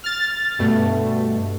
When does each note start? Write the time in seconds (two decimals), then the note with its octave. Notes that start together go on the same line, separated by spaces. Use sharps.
0.04 F6 A6
0.59 G2 B2 A3